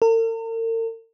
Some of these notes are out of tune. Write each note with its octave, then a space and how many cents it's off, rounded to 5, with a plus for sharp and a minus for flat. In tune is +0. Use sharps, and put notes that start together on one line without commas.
A#4 -45